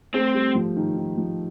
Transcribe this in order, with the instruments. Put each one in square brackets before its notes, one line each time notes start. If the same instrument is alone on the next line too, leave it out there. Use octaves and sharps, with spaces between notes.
[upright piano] A3 [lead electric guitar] C4
[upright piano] G3
F3
D#3
D#3
F3